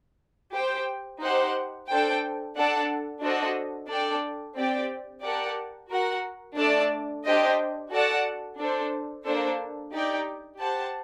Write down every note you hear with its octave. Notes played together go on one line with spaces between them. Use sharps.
G4 C5 G5
D#4 G4 C5 F#5
D4 A4 C5 G5
D4 A4 D5 F#5 A5
D4 F#4 A4 C5 D#5
D4 A4 D5 G5
C4 G4 D5 G5
G4 A#4 D5 F#5 A5
F#4 A#4 F#5
A3 D4 A4 D5 A5
D4 G4 C5 D#5 G5
F#4 A4 D5 F#5 A5
D4 A4 C5
A#3 D4 A4 C5
D#4 G4 D5 G5
G4 C5 F#5 A5